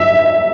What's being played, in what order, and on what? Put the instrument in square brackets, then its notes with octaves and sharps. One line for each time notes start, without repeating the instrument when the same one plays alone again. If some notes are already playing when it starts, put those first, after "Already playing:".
Already playing: [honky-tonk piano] E5